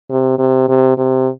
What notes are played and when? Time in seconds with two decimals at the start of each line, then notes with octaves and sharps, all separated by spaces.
0.10 C3
0.39 C3
0.69 C3
0.97 C3